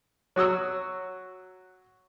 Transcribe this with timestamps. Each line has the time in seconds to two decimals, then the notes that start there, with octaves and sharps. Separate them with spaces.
0.36 F#3 F#4 D#6 E6